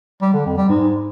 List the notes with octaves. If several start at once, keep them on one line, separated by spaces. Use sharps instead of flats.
G3
D3
F2
G3
G#2